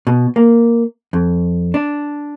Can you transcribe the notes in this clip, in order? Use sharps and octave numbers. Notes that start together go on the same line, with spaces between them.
B2
A#3
F2
D4